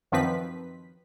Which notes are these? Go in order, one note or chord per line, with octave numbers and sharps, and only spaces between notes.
F#2 D#3 F3 C4 B4 B6